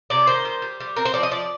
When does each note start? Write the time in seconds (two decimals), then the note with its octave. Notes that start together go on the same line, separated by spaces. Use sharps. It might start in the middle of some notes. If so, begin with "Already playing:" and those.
0.10 C3 D5
0.27 D#3 C5
0.45 G3
0.62 G3
0.80 G3
0.96 C4 A#4
1.05 C5
1.14 F3 D5
1.23 D#5
1.31 F3 D5